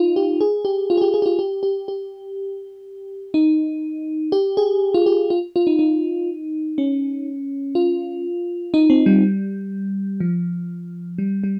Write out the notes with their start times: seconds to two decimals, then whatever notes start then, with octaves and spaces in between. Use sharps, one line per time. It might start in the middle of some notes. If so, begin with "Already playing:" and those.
Already playing: D#4 F4
0.16 G4
0.41 G#4
0.65 G4
0.90 F4
0.97 G#4
1.02 G4
1.14 G#4
1.22 G4
1.26 F4
1.39 G4
1.63 G4
1.88 G4
3.34 D#4
4.32 G4
4.57 G#4
4.94 F4
5.06 G4
5.30 F4
5.56 F4
5.67 D#4
5.79 D#4
6.78 C#4
7.75 F4
8.74 D#4
8.90 C4
9.06 G3
10.20 F3
11.18 G3
11.44 G3